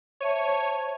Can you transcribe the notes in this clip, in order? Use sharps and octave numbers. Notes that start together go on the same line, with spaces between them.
C5 C#5 E5 A5 D#7